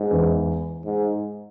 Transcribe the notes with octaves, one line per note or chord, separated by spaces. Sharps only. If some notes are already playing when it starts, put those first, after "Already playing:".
Already playing: G#2
E2 E3
G#2